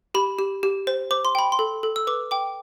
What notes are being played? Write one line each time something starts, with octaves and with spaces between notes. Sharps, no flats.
G4 B5
G4
G4
C5
C5 D6
C6
G5 B5
C6
A4
A4
E6
B4 D6
G5 D6